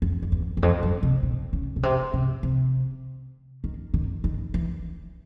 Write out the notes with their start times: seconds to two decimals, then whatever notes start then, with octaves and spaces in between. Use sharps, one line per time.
0.02 F2
0.22 F2
0.32 E2
0.57 E2
0.63 F2
0.83 F#2
1.03 C3
1.23 B2
1.53 C#3
1.76 B2
1.83 C3
2.14 C3
2.43 C3
3.64 D#3
3.94 D#3
4.24 D#3
4.54 E3